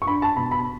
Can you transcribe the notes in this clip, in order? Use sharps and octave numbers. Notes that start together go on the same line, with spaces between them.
C#6
D4 B5
A5
B2 B5
B5